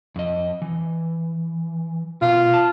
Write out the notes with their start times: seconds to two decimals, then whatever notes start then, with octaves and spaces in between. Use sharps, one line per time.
0.16 F2 D#5
0.62 E3
2.22 B2 F4
2.54 A5